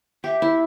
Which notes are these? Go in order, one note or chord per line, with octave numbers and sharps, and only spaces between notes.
G4 E5
E4